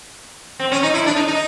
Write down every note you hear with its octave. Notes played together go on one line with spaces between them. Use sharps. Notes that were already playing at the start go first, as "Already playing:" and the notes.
C4
C#4
D#4
E4
D4
D#4
D#4